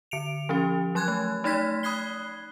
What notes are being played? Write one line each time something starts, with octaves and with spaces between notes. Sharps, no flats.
D3 C#7 D7 F7
F3 C#4 G4
F#3 C6 F#6 G#6
A3
A3 D#4 D5 C6 G#6 B6
B5 D#6 F#6 G#6 C7 G7